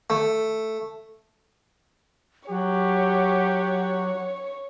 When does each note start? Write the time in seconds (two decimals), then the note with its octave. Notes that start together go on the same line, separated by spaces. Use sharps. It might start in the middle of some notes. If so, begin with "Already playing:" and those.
0.10 A3
2.49 F#3 G4 C#5